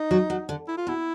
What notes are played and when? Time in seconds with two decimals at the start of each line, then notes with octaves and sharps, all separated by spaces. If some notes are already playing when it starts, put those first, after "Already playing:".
Already playing: D#4
0.11 F#3
0.30 F#3
0.49 D3
0.68 E4
0.77 F4
0.87 B2 E4